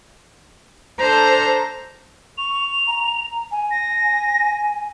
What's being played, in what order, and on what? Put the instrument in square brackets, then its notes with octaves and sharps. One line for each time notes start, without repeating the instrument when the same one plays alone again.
[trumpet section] D4 A#5 [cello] A4 C5
[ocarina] C#6 [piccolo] F7
[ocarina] A#5
G#5
[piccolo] A#6